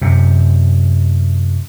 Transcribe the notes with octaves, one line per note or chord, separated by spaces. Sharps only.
F#2 C3